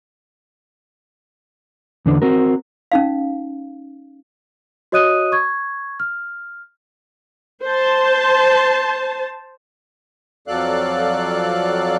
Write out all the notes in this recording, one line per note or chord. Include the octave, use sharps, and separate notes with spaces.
E2 D3 D4
C4 F#4 A#4
C#4 D#4 F5
F#4 C#5 D#5 D#6 F#6 D#7
C#6 G#6
F6
C5 A5
F2 F#3 A4 D5 F5 F#6